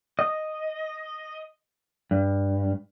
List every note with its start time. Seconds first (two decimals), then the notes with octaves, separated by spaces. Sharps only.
0.19 D#5
2.11 G2